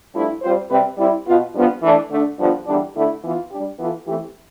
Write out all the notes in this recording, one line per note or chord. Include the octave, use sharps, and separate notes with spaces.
G2 F3 A3 E4
G3 C4 F4 C5
C3 G3 C4 G4 B4
G3 C4 E4
B2 B3 F4
G2 F3 B3 F4
E3 A3 D4
D3 A3 D4
G2 D3 F3 B3
E2 D3 G3 D4
D3 A3 E4
E3 B3 F4
G3 D4 G4
E3 B3 F4 A4
E3 A3 C4 G4